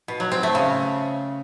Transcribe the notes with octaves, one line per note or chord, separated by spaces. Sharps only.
B2
F#3
C4
A3
C#3